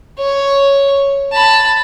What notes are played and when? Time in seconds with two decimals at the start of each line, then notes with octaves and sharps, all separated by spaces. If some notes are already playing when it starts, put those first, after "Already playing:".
0.19 C#5
1.33 A5 B5